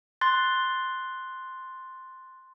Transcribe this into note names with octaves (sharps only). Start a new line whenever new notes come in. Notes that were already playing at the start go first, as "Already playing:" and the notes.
C6 F#6 A6